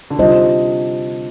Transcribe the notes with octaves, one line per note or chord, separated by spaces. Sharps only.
D3
C3 G3 D4 F4 C5 D#5